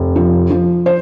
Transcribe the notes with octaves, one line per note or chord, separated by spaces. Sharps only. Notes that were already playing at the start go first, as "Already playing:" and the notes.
Already playing: F1
F3
F3
C5